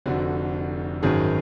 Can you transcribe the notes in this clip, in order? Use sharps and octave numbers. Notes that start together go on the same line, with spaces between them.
F1 F2 D3 F#4
G#1 F#2 D#3 F#3 G#4